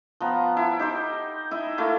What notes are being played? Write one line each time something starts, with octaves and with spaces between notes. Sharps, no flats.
F3 B3 A#5
E4
D#4 G4 C5
E4 D#5 E5
A3 A#3 E4